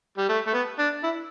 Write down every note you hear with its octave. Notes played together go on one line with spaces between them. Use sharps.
G3
A3
A3
B3
D4
E4